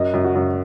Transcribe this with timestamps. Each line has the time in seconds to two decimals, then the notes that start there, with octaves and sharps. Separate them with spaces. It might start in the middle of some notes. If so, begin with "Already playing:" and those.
Already playing: F#2 D#5
0.14 F#2
0.24 F#4
0.35 F#2